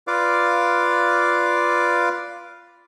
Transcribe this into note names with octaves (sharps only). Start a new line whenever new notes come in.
F4 B4 D5 F5 D6